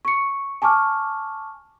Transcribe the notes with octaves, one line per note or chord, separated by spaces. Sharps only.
C#6 C#7
G#5 A5 C#6 D6 F6